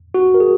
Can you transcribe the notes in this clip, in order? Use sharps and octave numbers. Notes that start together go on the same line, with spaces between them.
F#4
A#4
G#4